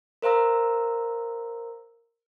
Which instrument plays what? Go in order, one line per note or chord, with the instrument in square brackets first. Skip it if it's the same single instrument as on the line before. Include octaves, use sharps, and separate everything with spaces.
[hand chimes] A#4 C5 F5 A#5 E6